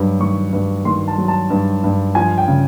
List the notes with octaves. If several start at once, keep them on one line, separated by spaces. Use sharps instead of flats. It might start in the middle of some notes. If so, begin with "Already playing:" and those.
Already playing: G2 F#3
D#3 C#6
G2
D#3 C6
A5
F#3
A5
G2
G2
F3 G#5
G5
C#3